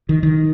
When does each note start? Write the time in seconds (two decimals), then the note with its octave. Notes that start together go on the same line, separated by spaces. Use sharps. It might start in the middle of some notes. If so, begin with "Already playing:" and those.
0.09 D#3
0.23 D#3